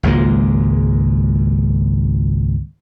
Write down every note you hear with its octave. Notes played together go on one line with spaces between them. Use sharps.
G#1 C#2 G#3 A#3